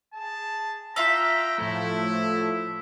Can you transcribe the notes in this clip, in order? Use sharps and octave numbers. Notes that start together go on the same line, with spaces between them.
G#4 A5
F4 E5 F5 G5 A#5 E6 B6
A2 F3 A3 E4